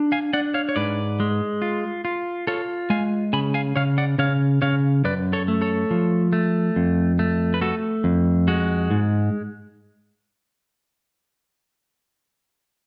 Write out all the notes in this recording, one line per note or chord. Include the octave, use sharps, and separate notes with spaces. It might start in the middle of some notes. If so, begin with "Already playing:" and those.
Already playing: D4
F5 G#5
D4 D5 F#5
C#5 F5
C#5
G#2 B4 D5
G#3
F4
F4
F4 A4 C#5
G#3 F5 G#5
C#3 G#5 B5
F5 G#5
C#3 C#5 F5
D5 F#5
C#3 C#5 F5
C#3 C#5 F5
F#2 B4 D5
A4 C#5
A3
A4 C#5
F3
A3
F2
A3
B4
A3 F#4 A4
F2
G#3 F#4
G#2